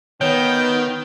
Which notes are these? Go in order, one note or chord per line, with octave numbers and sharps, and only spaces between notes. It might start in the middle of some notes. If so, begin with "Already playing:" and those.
D#3 B3 C#5 G5